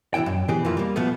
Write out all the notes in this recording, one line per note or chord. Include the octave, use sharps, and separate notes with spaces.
B2 E3 B3 E4 G5
F#2
B2 E3 C4 G4 G#4
F2 E3 A#3 C4 F4
G3 A#3
B2 F3 A3 B3